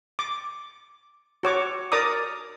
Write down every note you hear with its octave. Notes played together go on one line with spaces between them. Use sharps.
D6
F#4 C#5 D6
A#4 D5 A#5 D6 D#6